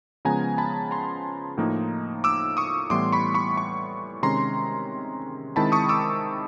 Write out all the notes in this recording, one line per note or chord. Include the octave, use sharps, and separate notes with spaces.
C#3 F3 G#3 B3 G#5 A#5
A5 B5
A#5 C6
A2 F3 A#3 D#4
D6 E6
C#6 D#6
A2 E3 G3 B3 E4 C6 D6
B5 C#6
B5 C#6
B5 C#6
C3 D#3 G#3 C#4 A#5 C6
D#3 G#3 C4 E4 A5 B5
C#6 D#6
D6 E6